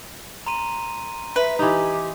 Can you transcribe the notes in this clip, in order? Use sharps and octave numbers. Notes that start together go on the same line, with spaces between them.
A#5 C6 D#7
B4 E5
E3 D#4 G4